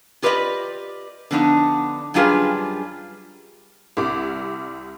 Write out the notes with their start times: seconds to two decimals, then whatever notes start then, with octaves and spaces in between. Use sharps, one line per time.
0.22 F4 G4 B4 C5 D5 D#5
1.31 D3 F3 B3 D4 D#4
2.14 F#2 G3 D4 F4 G#4 B4
3.97 C2 G3 D6